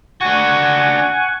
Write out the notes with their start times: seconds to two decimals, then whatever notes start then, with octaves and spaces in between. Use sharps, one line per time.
0.21 D4 F#4 F#5 G#5 C#6